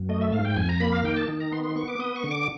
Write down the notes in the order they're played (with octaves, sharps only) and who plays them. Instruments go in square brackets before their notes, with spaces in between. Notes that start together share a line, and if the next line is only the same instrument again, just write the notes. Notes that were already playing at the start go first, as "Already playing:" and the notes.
Already playing: [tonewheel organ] F#2
A3 D#5
E5
G#2 F5
G5
F2 G#5
A#5
A#3 B5
F5
D#3 G5
A5
D#3
A#5
B3 C6
C6
B3 C#6
D6
B3 D#6
C#6
D3
D6